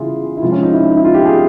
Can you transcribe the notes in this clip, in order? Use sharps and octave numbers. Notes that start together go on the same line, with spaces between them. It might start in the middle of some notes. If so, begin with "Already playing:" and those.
Already playing: C#3 E3 G3 E4 F4 G#4
E4
C3 F3 G#3 F4
C#4
D#4
E4
E4
F4
G4
G#4